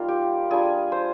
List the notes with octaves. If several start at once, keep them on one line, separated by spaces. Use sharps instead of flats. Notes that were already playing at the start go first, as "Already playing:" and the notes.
Already playing: G3 A#3 D#4 F4
G4
G3 D4 F4 G#4
C5